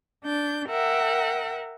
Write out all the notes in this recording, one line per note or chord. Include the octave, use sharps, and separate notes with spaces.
D4 G6
A#4 E5 F#5 G5